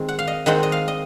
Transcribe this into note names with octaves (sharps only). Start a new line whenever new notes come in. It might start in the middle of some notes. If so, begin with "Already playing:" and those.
Already playing: D#3 G#3 C4
F#5
F5
D#5
D#3 G#3 C4 F#5
D#5
F5
D#5